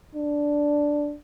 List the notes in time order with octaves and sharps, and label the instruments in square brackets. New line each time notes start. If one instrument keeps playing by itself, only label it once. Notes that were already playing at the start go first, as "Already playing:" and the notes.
[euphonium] D4